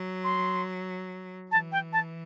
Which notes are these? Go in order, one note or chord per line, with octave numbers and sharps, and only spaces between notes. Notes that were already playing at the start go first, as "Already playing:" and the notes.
Already playing: F#3
C6
E3 A5
G5
A5